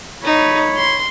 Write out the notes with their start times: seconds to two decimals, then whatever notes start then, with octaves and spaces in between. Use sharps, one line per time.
0.24 D#4 C#5 B5
0.76 C6